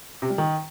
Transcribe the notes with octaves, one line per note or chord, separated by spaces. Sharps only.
C3
G3
D#3